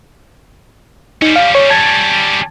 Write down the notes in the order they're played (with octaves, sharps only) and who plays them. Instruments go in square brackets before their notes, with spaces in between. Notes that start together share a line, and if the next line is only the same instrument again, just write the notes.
[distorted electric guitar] G3 C#4 [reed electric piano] D#4
[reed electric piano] F5
C#5
A5 G#6 A6